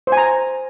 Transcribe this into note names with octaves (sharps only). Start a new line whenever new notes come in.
C5
G#5
A#5